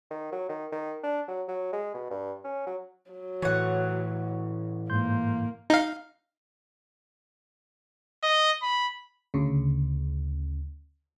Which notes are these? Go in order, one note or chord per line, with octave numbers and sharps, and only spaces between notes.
D#3
F#3
D#3
D#3
D4
F#3
F#3
G#3
B2
G2
C#4
F#3
F#3
A2 E3 C#5 F#5
G#2 A#3 C6 G6
D#4 F5
D#5
B5
D2 C#3